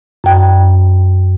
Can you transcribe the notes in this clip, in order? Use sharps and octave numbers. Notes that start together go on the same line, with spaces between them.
F#2 G5